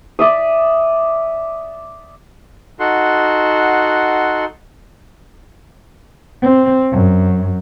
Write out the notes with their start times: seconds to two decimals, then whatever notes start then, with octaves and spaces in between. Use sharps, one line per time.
0.19 D5 E5 D#6
2.80 D#4 F#4 A4 F#5 C6
6.42 C4
6.91 F#2